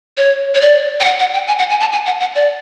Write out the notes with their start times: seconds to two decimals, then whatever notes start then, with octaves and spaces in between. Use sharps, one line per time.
0.17 C#5
0.55 C#5
0.61 D5
1.00 G5
1.04 F#5
1.20 F#5
1.34 G5
1.48 G#5
1.58 F#5
1.70 G#5
1.80 A5
1.92 G#5
2.06 F#5
2.20 F#5
2.35 D5